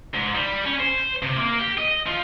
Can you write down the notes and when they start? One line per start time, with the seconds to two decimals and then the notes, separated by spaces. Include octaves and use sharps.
0.14 G#2
0.35 G3
0.65 C#4
0.80 C5
1.23 C3
1.36 A#3
1.59 G4
1.78 D#5
2.06 F3